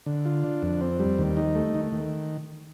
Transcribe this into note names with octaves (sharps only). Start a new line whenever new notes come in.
D3
F4
D4
F2
C4
G3
D#2
D#4
A3
D#3
D#3